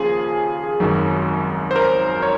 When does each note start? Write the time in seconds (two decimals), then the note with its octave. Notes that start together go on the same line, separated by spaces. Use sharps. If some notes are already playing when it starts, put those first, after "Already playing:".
Already playing: D#2 C#3 F3 F4 G#4
0.80 G#1 F#2 D#3 F#3
1.71 C5
1.76 A#4
2.23 C#5